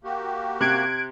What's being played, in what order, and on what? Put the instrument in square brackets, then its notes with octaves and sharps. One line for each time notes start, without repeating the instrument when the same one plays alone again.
[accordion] A#3 F#4 G4
[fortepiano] C3 [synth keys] F#6 G#6 D7